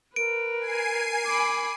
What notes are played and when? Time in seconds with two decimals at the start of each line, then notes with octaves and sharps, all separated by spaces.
0.16 A#4 B4 D7
0.59 G#5 C7 D#7
1.26 B5 D6